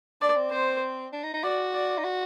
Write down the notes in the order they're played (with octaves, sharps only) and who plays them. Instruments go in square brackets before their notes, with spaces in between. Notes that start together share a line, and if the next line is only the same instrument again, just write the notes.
[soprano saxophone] D4 [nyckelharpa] D5
[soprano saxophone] C4
[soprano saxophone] C4 [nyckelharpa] C5
[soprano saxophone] D4
D#4
D#4
[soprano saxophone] F#4 [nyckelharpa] D5
[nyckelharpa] D5
[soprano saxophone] D#4
F#4